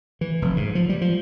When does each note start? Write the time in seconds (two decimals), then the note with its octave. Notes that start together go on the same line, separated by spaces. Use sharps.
0.21 E3
0.42 F1
0.57 G#2
0.75 F3
0.89 G3
1.01 F3